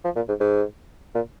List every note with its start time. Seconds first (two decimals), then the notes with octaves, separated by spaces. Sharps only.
0.05 F3
0.16 A#2
0.29 G#2
0.40 G#2
1.15 A#2